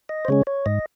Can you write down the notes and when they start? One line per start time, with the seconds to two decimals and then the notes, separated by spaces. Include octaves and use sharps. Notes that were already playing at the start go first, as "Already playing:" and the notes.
0.09 D#5
0.25 C5
0.28 C#3 G#3 C#4 C#5
0.47 C#5
0.66 G#2 D#5